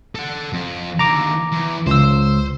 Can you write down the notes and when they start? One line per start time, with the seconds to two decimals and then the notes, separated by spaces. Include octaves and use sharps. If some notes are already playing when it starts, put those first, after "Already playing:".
0.15 A4 F#5
0.53 F2
0.99 D#2 D3 A#5 D6
1.52 E2
1.87 C#2 C5 E6